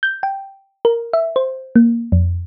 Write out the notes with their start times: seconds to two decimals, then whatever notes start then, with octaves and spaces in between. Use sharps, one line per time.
0.03 G6
0.23 G5
0.85 A#4
1.13 E5
1.36 C5
1.76 A#3
2.12 F2